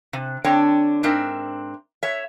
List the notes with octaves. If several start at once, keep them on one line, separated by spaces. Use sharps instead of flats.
C3
D3 C4 D4 C#5 G5
G#2 C4 D4 A#4 E5
C#5 E5